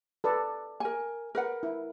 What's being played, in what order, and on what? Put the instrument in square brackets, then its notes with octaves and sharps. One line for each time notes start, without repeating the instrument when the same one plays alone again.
[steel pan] A4 B4 D5
[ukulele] A#4 G#5
A#4 B4 F#5
[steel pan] E4